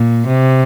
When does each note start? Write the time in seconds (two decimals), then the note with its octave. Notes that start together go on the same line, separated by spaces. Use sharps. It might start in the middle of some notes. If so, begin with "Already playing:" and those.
Already playing: A#2
0.27 C3